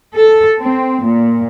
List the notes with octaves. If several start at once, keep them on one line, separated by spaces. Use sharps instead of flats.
A4
C4
A#2